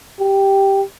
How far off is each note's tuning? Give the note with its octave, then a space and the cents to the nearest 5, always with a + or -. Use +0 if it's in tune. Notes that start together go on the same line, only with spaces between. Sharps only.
G4 +0